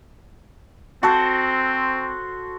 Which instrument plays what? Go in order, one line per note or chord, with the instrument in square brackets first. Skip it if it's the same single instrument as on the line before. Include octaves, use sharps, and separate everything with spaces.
[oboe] C4 [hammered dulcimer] F#4 A4 C5